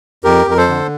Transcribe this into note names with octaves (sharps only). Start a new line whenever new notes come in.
F2 G4 A#4
F2 A#4
A4 C5
D3